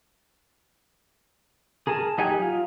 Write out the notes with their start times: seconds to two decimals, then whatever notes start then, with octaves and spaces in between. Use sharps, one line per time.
1.87 G#4 A#4 G#5 A5
2.18 F#3 D#4 G4 G#5
2.42 F4